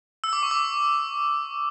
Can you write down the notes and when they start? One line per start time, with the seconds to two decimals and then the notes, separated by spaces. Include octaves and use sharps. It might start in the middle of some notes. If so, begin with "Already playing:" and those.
0.24 E6
0.33 D6
0.43 C#6
0.51 D6